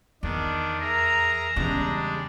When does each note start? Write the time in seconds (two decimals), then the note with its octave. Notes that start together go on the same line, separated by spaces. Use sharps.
0.23 E2 D#3 D4
0.81 G#4 A#4 E5 A#5
1.56 E2 C#3 G3 G#3 D4